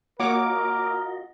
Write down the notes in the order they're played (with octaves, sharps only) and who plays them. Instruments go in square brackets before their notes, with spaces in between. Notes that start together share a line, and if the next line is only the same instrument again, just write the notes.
[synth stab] A#3 C#5 D6 [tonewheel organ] F4 F#4 D#5 [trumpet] A#4 [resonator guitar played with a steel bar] F#5